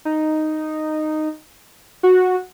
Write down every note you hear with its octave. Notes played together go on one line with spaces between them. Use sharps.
D#4
F#4